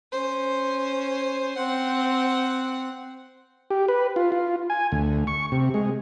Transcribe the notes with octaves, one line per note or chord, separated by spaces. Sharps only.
C#4 C5
C4 F#5
G4
B4
F4
F4
G#5
D2
C#6
C3
G#3